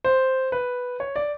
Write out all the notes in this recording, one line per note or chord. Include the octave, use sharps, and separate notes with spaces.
C5
B4
C#5
D5